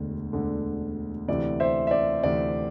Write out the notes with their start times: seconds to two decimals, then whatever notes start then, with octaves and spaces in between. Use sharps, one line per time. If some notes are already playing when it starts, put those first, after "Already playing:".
Already playing: E1 D2 D3
0.33 E1 D2 D3
1.28 D2 C3 E3 D5
1.60 C5 E5
1.87 E5
1.91 D5
2.23 D2 C3 E3 D5